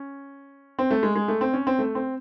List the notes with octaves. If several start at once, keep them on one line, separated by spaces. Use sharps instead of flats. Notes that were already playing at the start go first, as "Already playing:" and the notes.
Already playing: C#4
C4
A3
G#3
G#3
A3
C4
C#4
C4
A3
C4